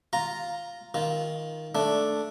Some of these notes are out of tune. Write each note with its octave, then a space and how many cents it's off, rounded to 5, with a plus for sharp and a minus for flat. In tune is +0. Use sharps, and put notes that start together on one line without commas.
F4 +0 A#5 +0
D#3 +10 F4 -10
A3 +0 D4 +0